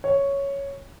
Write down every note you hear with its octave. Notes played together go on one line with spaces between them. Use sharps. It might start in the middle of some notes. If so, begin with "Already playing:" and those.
C#5